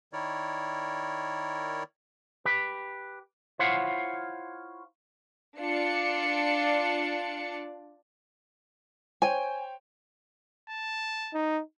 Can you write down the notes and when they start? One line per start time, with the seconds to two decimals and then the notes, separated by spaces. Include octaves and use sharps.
0.13 D#3 E4 A#4 C#5 D5
2.45 G4 B4
3.59 E4 F4 C5 C#5 F5 F#5
5.58 D4 F4 D5 C#7
9.22 C5 C#5 G5 G#5
10.69 A5
11.34 D#4